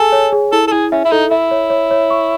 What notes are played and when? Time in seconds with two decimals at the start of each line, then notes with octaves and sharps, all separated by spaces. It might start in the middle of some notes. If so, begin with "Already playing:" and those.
Already playing: G#4 A4 G#5
0.12 C#5
0.33 G#4
0.52 E4 A4
0.67 A4
0.72 E4 G#4
0.92 C#4 E5
1.05 E4
1.11 D#4 A4
1.30 E4 E5
1.51 C#5
1.70 C#5
1.91 C#5
2.10 C#6